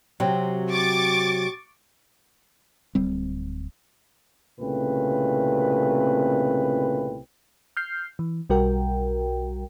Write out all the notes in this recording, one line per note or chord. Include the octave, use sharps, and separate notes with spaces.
C3 F#3 C4
C#6 D6 A6
D1 G3 C4
C2 A#2 C#3 A3 C4 B4
F6 G6 C7
E3
B1 G3 F#4 A#4 G5